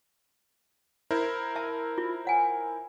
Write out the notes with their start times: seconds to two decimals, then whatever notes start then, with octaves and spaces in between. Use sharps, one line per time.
1.11 E4 A#4 C5
1.55 E5 A5
1.98 F4
2.25 C#5 F#5 G#5